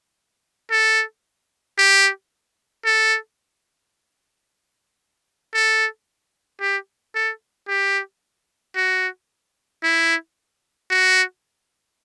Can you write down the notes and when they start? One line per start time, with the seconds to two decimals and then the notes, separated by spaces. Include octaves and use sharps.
0.71 A4
1.78 G4
2.85 A4
5.54 A4
6.61 G4
7.15 A4
7.68 G4
8.76 F#4
9.83 E4
10.90 F#4